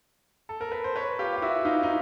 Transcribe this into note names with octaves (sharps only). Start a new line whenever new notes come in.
A4
A#4
B4
C5
B4 C#5
F4 G4
F4
E4 F#4
D#4 F4
D#4